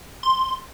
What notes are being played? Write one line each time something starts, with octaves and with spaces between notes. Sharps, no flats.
C6